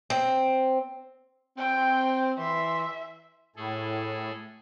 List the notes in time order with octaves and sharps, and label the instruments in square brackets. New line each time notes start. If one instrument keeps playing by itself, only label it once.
[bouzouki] C4
[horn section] C4 [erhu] G5
[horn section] E3 C6 [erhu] E5
[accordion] A2 [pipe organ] G#4 A4